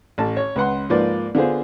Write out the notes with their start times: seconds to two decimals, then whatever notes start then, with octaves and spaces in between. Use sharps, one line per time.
0.18 A1 A5
0.37 C#5
0.56 C#2 B4 F#5 C6
0.90 G#2 F3 A#3 B4 D5
1.35 D3 B3 F4 G#4 C5